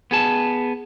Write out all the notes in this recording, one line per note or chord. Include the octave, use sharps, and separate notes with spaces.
B3 G#4 A5